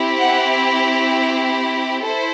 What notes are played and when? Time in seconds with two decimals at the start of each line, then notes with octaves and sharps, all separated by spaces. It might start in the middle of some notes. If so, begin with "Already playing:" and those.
Already playing: C4 E4 G4
0.19 F#5
2.02 E4 A4 C5